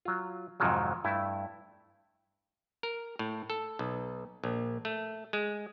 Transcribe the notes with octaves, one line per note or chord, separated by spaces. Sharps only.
F#3 F4
F2 G#2 C3 D#3 F3 F#3
G2 A3 E4
A#4
A2
A4
B1
A#1
A3
G#3